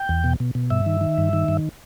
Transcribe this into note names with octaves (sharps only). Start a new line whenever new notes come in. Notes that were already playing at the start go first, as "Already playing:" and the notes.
Already playing: G5
E2
B2
B2
B2
G2 E5
D#3
D#3
G2
D#3
G2